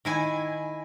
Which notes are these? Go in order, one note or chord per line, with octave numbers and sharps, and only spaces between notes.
D#3 E4 G#5